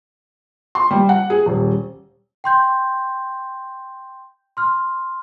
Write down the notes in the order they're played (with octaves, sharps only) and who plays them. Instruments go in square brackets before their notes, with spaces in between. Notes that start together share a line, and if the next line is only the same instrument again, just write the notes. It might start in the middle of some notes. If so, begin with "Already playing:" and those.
[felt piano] C6
G3
F#5
G#4
D#1
[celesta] G5 C6 G6
C6 F6